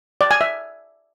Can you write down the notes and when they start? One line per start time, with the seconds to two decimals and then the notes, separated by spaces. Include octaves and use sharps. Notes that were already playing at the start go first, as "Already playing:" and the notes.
0.21 D5
0.31 G#5
0.41 E5